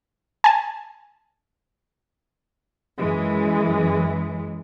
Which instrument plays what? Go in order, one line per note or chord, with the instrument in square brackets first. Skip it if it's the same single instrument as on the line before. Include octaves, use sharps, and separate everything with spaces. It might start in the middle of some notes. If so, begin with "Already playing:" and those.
[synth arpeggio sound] G#5 A5
[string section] F#2 E3 G#3